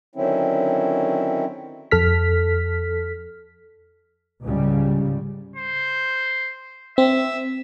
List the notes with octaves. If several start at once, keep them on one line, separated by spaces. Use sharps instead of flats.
D3 D#3 F#3 C4 C#4 E4
F2 A4 F6 B6
C#2 G#2 C#3 G3
C5
C4 E5